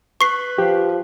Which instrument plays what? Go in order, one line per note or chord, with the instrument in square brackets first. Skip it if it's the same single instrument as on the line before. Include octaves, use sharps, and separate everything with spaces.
[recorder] B4 [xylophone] C#6 C7
[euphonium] F3 [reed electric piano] G4